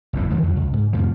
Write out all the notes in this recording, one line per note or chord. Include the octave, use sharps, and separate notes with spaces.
F#1 E2 A2
D3 E3 F3 G#3
F2 F#3
C#2
G#2
F2 A2 C3 F3